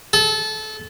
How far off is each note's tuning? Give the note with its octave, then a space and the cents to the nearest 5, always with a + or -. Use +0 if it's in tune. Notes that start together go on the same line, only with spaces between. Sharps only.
A4 -25